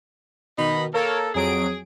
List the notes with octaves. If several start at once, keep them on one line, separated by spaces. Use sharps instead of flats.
B2 D#3 D#4 B5
A#3 A4 A#4 C#5
F2 F#3 G#4 D7